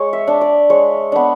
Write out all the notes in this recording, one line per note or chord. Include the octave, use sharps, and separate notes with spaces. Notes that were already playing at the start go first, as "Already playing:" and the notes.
Already playing: G#3 C#5
E5
D4
D5
G#3 C#5
B3 D4